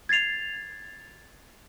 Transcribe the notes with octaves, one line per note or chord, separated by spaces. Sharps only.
G#6 A6 C7 F7